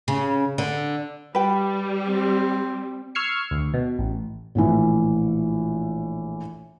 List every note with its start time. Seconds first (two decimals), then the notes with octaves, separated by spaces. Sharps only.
0.08 C#3
0.58 D3
1.35 G3 B4 G5
2.07 C4
3.15 C#6 E6 F6 G#6 C7 C#7
3.51 D2
3.74 B2
3.99 A1
4.55 A#1 A2 E3